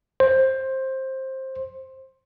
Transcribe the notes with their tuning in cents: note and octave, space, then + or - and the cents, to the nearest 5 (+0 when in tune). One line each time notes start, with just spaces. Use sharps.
C5 +15